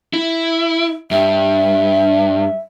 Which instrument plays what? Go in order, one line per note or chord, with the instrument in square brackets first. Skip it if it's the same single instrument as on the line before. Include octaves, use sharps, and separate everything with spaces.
[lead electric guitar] E4
[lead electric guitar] G2 [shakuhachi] E5